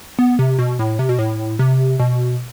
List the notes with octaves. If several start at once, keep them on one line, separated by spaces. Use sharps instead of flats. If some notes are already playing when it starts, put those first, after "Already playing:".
B3
C3
B2
A2
C3
B2
A2
C3
B2